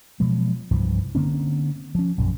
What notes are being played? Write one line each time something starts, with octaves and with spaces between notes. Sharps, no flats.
B2 F3 F#3 G#3
C2 G2 E3 F3
D3 A#3 C4 C#4
F3 C#4
A#1 F#2 B2